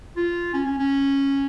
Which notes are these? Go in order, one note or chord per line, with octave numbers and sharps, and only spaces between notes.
F4
C#4
C#4
C#4